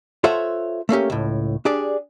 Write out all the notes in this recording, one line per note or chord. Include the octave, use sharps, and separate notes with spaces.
F4 A4 C5 C#5 E5 F#5
A3 A#3 C#4 G4
C#2 A2
D4 G4 G#4 D5